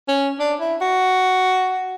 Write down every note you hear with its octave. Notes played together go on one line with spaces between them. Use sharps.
C#4
D4
E4
F#4